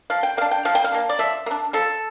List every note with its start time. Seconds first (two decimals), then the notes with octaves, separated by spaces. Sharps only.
0.10 F3 F5
0.23 G5
0.37 A#3 D4 F5
0.51 G5
0.65 F3 F5
0.75 G5
0.84 F5
0.92 A#3 D4
1.09 D5
1.19 F3 E5
1.46 A#3
1.51 D4
1.73 F3 A4